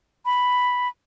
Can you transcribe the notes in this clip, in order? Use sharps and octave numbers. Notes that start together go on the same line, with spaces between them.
B5